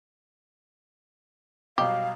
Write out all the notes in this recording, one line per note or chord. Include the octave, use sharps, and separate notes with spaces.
B2 F#3 G3 G4 F5